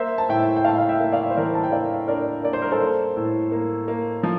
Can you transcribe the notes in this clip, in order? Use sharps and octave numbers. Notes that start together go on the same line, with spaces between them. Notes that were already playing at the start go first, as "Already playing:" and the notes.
Already playing: A#3 C5 E5
A5
A2 E5 G5
G5
A2 F5 A5
F5
E5 G5
A#3
D5 F5
C5
E3 A#4 D5
A5
G5
A#3 D5 F5
D4 A#4 D5
A#3 D5
C5
A#4
A4 C5
A#3
A2
A#3
A#3
F3